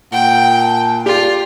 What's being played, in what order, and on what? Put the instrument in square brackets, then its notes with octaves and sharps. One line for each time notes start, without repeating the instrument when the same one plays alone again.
[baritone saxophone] A#2 [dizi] F#5 [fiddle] G5
[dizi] A5
[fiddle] F4 [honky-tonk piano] G4 [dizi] D5